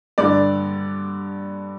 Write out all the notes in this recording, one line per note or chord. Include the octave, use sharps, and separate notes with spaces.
G2 D3 D5